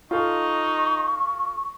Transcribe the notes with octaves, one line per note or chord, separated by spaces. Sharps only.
D#4 F4 A4 C#6